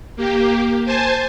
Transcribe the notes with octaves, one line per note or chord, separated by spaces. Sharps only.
A#3 G4
C5 G#5 A5